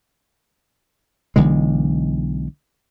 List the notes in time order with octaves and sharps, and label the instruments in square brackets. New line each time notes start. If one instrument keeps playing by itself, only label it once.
[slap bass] B1 D3 E3 G#3